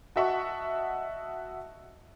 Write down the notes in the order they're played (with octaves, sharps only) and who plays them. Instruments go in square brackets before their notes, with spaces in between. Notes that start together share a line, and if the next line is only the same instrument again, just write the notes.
[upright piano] F#4 D#5 E5 F#5 A5 C#6